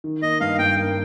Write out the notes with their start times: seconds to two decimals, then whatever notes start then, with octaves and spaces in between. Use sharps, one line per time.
0.04 D#3
0.22 A#3 D#5
0.40 G2 F5
0.59 G2 G5
0.77 A#3